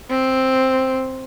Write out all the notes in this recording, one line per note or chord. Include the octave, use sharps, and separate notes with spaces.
C4